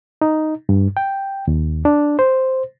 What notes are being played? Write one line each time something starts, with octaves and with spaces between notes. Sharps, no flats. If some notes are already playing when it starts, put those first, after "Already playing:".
D#4
G2
G5
D#2
D4
C5